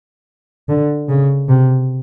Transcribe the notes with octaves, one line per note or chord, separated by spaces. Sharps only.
D3
C#3
C3